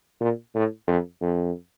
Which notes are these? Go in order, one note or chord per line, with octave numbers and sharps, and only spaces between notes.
A#2
A2
F2
F2